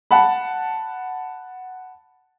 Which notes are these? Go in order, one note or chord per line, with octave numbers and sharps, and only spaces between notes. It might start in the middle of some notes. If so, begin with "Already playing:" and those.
F#5 A5 B5